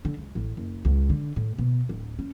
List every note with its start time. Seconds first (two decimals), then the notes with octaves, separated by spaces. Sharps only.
0.05 D3
0.17 C#2
0.35 A1
0.57 F#1
0.85 C#2
1.10 D3
1.36 A2
1.58 B2
1.89 D1
2.19 C#4